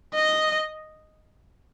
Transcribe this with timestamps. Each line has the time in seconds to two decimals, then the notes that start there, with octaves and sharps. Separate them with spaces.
0.15 D#5